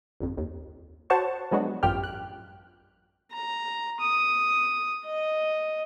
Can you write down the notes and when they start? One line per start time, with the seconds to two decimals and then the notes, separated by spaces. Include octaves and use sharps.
0.20 G1 F2
0.37 D#2
1.10 F#4 C5 C#5 F#5 A5 C#6
1.51 F3 F#3 G#3 B3 D4 F#4
1.83 A1 F#2 F4 G4 G5 F6
2.04 F#6
3.32 A#5
4.00 D#6
5.05 D#5